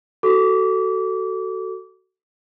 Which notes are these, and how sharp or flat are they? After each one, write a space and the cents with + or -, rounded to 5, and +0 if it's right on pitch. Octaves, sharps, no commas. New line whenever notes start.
F#4 +20 A4 +10 D6 -25